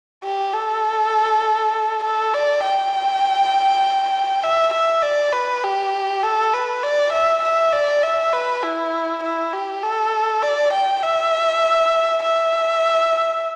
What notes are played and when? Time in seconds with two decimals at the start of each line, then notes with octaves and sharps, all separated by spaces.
0.24 G4
0.54 A4
2.04 A4
2.34 D5
2.63 G5
4.44 E5
4.73 E5
5.03 D5
5.33 B4
5.64 G4
6.23 A4
6.54 B4
6.83 D5
7.13 E5
7.43 E5
7.73 D5
8.03 E5
8.33 B4
8.63 E4
9.23 E4
9.53 G4
9.83 A4
10.42 D5
10.73 G5
11.03 E5
12.23 E5